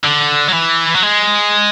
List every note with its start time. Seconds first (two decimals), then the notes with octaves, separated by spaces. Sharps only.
0.04 D3
0.48 F#3
0.54 E3
0.95 F#3
1.02 G#3